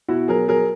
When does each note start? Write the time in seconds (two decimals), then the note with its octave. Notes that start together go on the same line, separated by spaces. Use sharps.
0.08 B2 E4 F#4
0.28 F#3 G#4 A#4
0.48 F#3 G#4 A#4